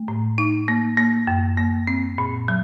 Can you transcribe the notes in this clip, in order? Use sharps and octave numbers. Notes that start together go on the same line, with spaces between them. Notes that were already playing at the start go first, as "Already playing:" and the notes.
Already playing: A3
A2
D#4
A#3
A#3
F#2
A#3
C4
A#2
F#3